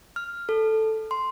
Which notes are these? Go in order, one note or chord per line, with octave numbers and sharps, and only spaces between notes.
F6
A4
C6